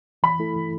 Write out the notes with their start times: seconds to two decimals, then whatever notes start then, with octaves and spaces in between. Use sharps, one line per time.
0.23 E3 B5
0.39 A3 E4 A4
0.56 E3